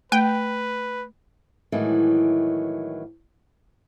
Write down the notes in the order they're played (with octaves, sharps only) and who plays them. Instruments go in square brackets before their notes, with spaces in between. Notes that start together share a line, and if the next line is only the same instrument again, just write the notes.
[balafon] A3 [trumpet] B4 [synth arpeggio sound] G5
[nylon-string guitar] A2 D#3 E3 F#3 G#3